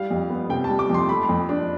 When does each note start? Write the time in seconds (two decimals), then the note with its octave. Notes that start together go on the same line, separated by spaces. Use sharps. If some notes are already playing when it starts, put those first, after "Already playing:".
Already playing: G3 F5
0.10 F2
0.30 B3
0.49 C3 G5
0.64 A5
0.70 G3
0.79 D6
0.89 F2 C6
1.09 A3 B5
1.29 F2
1.49 D4